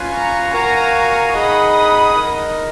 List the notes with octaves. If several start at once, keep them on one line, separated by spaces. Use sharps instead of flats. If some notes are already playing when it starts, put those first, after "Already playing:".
Already playing: C#4 F4 B4 F5 G#5
A#5 C#6
F#4 A#4 F5 G#5 A#5 C#6
A#5 C#6
D#4 G#4 D#5 F#5 B5 D#6
B5 D#6
D#4 A#4 D#5